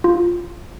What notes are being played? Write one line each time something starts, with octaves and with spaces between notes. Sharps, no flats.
F4